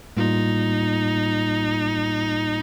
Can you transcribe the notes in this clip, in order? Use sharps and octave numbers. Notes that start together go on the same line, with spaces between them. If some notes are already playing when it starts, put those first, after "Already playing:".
A2 G3 A#3 D#4 F4